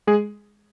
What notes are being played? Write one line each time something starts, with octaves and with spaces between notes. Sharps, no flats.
G#3 G#4